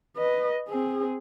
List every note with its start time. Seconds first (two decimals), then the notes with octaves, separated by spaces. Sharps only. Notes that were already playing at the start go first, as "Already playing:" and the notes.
0.17 B4 D#5
0.68 C4 G#4